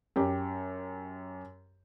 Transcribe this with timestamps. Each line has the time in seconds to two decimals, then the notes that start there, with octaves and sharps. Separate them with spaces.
0.16 F#2 G4